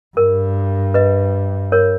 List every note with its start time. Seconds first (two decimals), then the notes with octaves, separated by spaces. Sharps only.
0.17 G2 A#4
0.94 B4 D#5
1.72 A#4 C#5